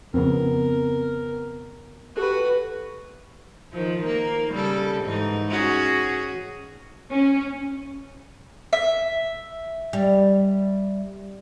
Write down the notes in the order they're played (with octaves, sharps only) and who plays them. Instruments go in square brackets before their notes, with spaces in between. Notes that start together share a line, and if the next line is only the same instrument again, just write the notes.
[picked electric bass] F2 C#3 [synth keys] B3 C4 [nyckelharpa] A#4
[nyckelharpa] F#4 B4 [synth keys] G4 A4
[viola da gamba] D#3 F3
A#3
C#3 G3 A4
G#2 E3 D#4
C#4 F#4 G#4
[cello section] C#4
[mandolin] E5
[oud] G3